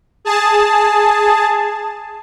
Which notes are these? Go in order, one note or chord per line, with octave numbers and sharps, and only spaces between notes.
G#4 A5